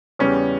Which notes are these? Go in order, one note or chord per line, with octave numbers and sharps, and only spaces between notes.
E2 C#3 G3 C#4